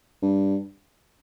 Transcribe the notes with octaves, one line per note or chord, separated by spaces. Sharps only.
G2